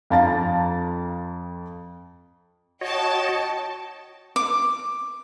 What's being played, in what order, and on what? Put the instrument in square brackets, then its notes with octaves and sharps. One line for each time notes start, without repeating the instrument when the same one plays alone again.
[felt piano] F2 F5 A5 A#5 A6
[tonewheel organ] F#4 C#5 D#5 [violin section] G5 A5
[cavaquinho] D6